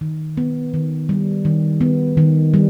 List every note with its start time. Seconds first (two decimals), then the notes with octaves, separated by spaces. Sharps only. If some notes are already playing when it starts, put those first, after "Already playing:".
0.01 D#3
0.37 B3
0.74 D#3
1.09 G3
1.45 D#3
1.81 B3
2.17 D#3
2.54 G3